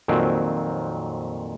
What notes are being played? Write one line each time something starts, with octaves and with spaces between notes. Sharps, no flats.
F2 A#2 D#3 F#3 C4